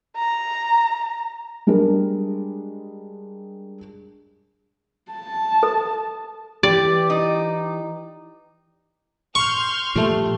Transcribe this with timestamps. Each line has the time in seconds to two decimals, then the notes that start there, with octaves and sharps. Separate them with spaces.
0.17 A#5
1.67 G3 G#3 D4 A#4
5.12 A5
5.63 A4
6.63 E3 G4 D5
7.10 D#4
9.35 C6 C#6 F6 G6
9.95 A#2 F3 G3 A3